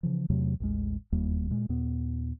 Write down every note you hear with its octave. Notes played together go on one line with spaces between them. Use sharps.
C#3 E3 F3
E2 C3 F#3 A3
A1 D#2 G#3
E1 D#2 G3 A#3
A#2 G#3
D#2 A#2 B3